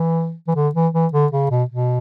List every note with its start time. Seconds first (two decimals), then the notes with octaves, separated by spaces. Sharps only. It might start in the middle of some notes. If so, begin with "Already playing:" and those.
Already playing: E3
0.48 E3
0.56 D3
0.75 E3
0.94 E3
1.13 D3
1.32 C#3
1.50 B2
1.69 B2